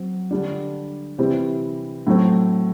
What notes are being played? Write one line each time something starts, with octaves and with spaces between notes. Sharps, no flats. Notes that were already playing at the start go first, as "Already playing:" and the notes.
Already playing: F#3 C4
D3 G3 D4
C3 E3 G3 C4
A2 F#3 A3 C4